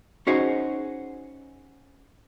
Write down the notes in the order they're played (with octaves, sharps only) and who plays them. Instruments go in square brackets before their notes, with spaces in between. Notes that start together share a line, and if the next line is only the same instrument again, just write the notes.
[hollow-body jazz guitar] C#4 D#4 F#4 G#4 C5